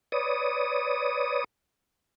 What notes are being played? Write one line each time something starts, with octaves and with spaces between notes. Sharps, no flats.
B4 C#5 D5 D#6